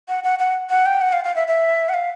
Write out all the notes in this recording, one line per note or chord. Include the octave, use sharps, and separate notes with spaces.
F#5
F#5
F#5
F#5
G5
F#5
F5
F5
E5
E5
F#5
F5